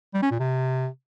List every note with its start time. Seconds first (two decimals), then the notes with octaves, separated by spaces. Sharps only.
0.14 G3
0.22 C#4
0.31 A#2
0.40 C3